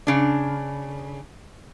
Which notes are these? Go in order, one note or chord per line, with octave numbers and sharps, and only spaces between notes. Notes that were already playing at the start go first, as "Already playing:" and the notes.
C#3 D4